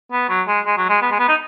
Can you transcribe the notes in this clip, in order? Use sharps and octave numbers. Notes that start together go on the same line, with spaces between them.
B3
F#3
G#3
G#3
F#3
G#3
B3
G#3
B3
D#4